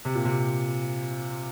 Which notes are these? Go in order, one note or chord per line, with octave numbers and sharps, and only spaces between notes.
C3
A#2
C3